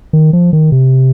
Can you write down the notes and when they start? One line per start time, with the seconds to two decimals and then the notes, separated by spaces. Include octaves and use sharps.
0.13 D#3
0.33 F3
0.53 D#3
0.72 C3